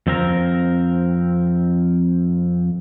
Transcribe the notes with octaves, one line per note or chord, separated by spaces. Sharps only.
F2 C4 A#4